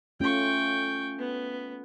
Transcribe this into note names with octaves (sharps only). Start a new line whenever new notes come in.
A3 C#4 F4 G5 C#6
B3